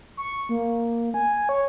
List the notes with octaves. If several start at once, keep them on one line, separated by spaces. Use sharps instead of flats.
C#6
A#3
G#5
C#5